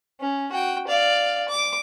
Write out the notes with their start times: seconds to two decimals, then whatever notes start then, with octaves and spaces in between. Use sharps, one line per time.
0.21 C#4
0.53 F#4 G5
0.88 D5 F5
1.48 D6